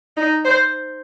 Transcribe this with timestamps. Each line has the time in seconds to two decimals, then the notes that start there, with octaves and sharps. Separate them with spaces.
0.17 D#4
0.45 C5